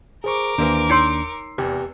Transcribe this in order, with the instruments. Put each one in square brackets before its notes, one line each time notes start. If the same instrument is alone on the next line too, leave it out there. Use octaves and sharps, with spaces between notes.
[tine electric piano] G#4 C5 C#6 [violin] A#4 D6
[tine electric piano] D#2 D4 [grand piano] E3 A#3 C5
[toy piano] D#4 C#5 C6 [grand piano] E6 C7 C#7
[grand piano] F1 E2 [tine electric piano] G4